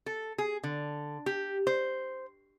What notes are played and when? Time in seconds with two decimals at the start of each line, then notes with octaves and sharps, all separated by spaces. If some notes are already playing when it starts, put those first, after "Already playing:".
0.06 A4
0.38 G#4
0.64 D3
1.26 G4
1.67 C5